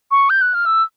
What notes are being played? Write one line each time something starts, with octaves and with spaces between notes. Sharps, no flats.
C#6
G6
F#6
F6
E6